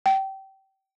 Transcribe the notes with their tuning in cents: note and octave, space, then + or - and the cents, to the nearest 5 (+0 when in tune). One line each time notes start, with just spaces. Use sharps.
G5 -25